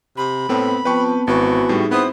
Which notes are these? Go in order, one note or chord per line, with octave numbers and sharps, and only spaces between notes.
C3 B5
A2 B3 C4
F3 B3 C4 B4 G5 A5 C#6
G#1 E3 F#4 C#6
A2 G3 D#4 G#4
B3 C4 E4 C5 D#6